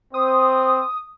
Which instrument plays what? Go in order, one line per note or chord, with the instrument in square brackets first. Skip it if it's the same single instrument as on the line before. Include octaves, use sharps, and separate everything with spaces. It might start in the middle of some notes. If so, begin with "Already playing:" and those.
[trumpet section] C4 C5 [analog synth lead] D#6